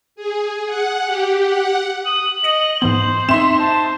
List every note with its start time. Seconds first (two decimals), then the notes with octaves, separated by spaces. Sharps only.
0.16 G#4
0.67 F#5
1.05 G4
1.45 F#5
2.06 D#6 F#7
2.44 D#5 A#6 C#7 D#7
2.82 G#2 E3 B3 C5
3.29 C4 D#4 E5 C6 E7
3.59 C5 A5